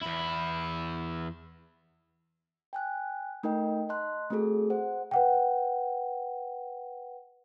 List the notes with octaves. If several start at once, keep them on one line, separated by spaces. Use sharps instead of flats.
E2 E4
G5 G#5 F#6
A3 D#4 A#4 D#5 G5
D#5 A5 C6 F#6
A3 C4 F#4 G#4 A4
C5 F#5
B4 F#5 G5